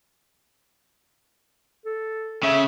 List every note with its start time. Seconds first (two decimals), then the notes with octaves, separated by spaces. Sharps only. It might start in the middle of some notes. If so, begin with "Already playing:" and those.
1.85 A4
2.43 C#3 E5